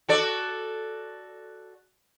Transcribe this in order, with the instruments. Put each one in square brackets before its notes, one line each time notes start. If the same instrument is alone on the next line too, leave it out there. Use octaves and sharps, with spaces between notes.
[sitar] F#4 A4 D5